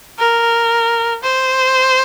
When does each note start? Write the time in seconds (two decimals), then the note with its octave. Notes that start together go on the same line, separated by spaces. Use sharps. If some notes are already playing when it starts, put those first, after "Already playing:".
0.19 A#4
1.23 C5